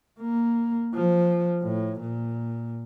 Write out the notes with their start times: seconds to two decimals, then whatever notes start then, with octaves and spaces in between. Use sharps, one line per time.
0.20 A#3
0.94 F3
1.63 A2
2.00 A#2